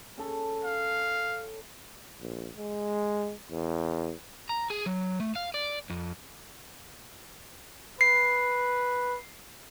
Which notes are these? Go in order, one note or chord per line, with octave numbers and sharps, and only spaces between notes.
C#4 A4
F5
A#1
G#3
E2
A#5
G#4
F#3
A3
F5
D5
F2
B4 C7